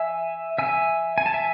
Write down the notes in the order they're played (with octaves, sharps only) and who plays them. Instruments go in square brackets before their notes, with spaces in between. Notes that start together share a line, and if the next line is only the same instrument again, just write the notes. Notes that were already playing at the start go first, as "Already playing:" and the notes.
Already playing: [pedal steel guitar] E5 G#5
E5 G#5
G#5
A5
E5 G#5